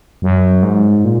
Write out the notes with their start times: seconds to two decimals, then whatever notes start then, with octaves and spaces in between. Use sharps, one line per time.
0.22 F#2
0.63 G#2
1.05 A#2